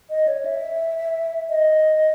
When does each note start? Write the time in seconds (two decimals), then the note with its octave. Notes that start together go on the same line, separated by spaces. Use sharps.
0.10 D#5
0.28 C#5
0.45 E5
1.50 D#5